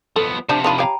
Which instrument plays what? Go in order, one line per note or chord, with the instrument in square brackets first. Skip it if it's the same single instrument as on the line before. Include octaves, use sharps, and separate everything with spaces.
[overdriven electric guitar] F3 B3 [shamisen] A4
[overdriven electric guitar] C3 F3 [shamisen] D4 C5 D5 [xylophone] A5
[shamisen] D#3 D4 F4 [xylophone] B5 D#7 F7
[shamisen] G4 C#5 F5 [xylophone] G5 A#5